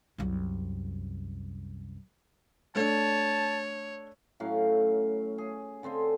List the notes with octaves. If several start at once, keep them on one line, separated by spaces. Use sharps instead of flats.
C2 F#2
A3 D4 C#5 A5
A2 F#3 C#4 F5
G#4
D3 C4 C5 G#5